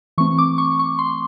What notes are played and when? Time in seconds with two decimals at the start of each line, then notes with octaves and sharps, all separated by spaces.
0.18 E3 A3 C4 C#6
0.38 D6
0.58 C#6
0.79 C#6
0.99 C6